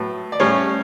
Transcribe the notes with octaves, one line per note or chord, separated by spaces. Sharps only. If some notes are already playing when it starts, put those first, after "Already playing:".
Already playing: A2 F#3 B3
D5
A2 G3 C#4 C#5